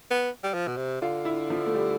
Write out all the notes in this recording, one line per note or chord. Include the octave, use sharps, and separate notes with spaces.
B3
G3
F3
B2
C3
D3 F4
E4
F3
A3
G3